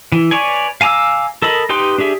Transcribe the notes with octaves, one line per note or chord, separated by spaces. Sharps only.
E3
B4 C#5 D5 G#5
F5 G#5 A#5 D6 E6
A4 A#4 D#5 B5
D#4 G4 B4 G5 C6
D4 G4 G#4 E5